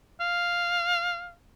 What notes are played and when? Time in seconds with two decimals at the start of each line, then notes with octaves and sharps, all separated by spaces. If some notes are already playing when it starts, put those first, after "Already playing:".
0.21 F5